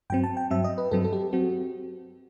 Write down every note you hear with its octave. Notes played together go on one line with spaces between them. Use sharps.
G2 F#3 C4 G5
A5
G5
G2 F#3 C4 E5
D#5
B4
G2 F#3 C4 A4
A4
G4
F#3 C4 F#4